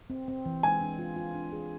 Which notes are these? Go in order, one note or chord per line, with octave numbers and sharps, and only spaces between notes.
C4
C4
E3
G#3 G#5
D4
F4
F4
D4
G#4